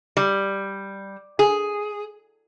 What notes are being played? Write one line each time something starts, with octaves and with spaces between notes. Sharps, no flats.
G3
G#4